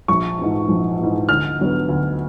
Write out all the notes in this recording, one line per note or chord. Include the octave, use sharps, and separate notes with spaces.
A#1 C#6
G#2 E3
A#1
G#2 E3
D2 F6
D3 F#3 B3
D2